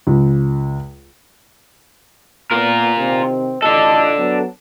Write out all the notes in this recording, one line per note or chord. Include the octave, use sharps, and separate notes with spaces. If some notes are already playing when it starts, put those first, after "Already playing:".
C#2
A#2 B3 F4 A#4
C3 D#3 C4
A1 D4 F4 A4 D#5
F#3 B3